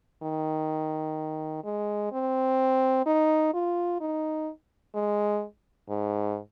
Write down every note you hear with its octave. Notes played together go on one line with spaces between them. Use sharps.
D#3
G#3
C4
D#4
F4
D#4
G#3
G#2